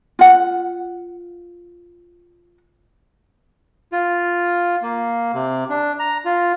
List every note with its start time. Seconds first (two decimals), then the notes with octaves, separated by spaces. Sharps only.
0.19 F4 F#5
3.92 F4
4.82 A#3
5.34 C3
5.70 D4
5.99 A#5
6.25 F4